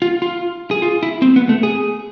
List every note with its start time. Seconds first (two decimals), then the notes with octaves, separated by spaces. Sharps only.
0.02 F4
0.22 F4
0.71 G#4
0.82 F4
1.03 E4
1.22 C4
1.36 B3
1.49 A3
1.63 G#4